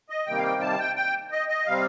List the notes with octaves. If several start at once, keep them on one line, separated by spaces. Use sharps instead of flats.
D#5
C3 D#3 G3 A#3 G5
F5
G5
A5
G5
G5
D#5
D#5
C3 G3 C4 F5